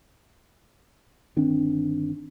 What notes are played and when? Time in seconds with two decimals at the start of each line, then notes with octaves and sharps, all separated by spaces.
1.36 G1 D#3 C4 D4